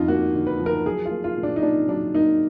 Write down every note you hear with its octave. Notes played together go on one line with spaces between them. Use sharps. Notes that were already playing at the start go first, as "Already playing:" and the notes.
Already playing: F2 D3 F3 D#4 F4
A#3 F#4
D3
B4
F3
A#4
F#3 G#4
F4
A#3
F4
A#2
D4
D#4
A#2 D4
F#3 D4
A#3 D#4